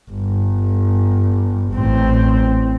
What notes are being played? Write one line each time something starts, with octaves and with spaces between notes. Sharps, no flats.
G1
A1 C4